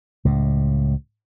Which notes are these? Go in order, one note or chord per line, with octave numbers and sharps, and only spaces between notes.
C#2 A2